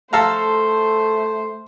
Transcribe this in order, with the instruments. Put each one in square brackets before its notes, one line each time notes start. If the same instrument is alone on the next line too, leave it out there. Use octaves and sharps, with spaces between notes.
[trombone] A3 [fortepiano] A4 F5 A#5 [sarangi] C5